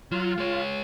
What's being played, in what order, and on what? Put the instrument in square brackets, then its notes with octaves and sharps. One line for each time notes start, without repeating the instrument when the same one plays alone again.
[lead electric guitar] F#3 [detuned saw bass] F4
[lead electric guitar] G#3 C#5